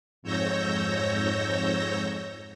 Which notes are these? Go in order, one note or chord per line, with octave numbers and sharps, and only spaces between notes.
F2 G#2 C#5 E6 G6 A#6